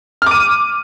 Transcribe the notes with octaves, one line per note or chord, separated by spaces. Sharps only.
D6 F6 D#7